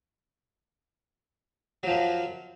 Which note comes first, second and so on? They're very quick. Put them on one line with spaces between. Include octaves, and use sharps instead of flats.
F#3 F3 F#2